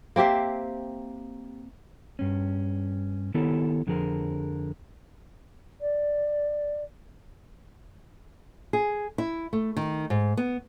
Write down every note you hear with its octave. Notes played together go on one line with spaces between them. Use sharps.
A#3 C4 G4 E5
G2 C#4
D#3 B3 E4 G4 A4 C#5
F2 D3 F3 G#4 A#4
D5
G#4
E4
A3
D#3
G#2
B3